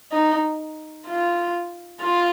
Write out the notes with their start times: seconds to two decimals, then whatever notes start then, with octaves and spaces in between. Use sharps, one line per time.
0.12 D#4
1.06 F4
2.01 F4